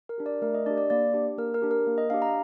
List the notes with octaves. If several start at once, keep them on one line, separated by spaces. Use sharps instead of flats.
A#4
D4 G4
D5
A3 A#4
D#5
D4 G4 D5
D5
A#3 D5
D4 G4
A#3 A#4
A#4
D4 G4
A#4
A#3
D#5
D4 G4 F5
A#5